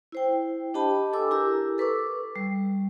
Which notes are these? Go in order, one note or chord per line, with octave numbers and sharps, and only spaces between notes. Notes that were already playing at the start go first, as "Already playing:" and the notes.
E4 C5 G5
D4 G4 D#5 G5 A5 B5
A4 G#5 D6 E6
E4 G4 A#4 A#5 E6
A4 B4 C#6 D6 E6
G3